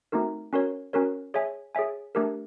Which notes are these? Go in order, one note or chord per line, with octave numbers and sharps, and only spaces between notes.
A3 C4 D#4 F#4 A#4
C#4 F#4 A#4 C#5
C#4 F#4 A#4 C#5
G#4 C#5 E5 G#5
G#4 C#5 E5 G#5
A3 D4 G4 A#4